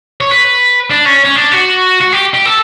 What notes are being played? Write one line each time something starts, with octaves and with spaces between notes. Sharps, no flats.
C#5
B4
D4
C#4
C#4
D4
F#4
F#4
G4
G4
A4